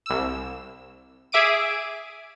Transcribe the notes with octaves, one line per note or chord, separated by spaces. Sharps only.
C2 E6
G#4 E5 D6 D7 D#7